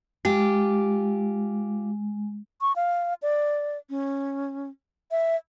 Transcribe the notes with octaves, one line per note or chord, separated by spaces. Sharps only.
G#3 F4 G4
C#6
F5
D5
C#4
E5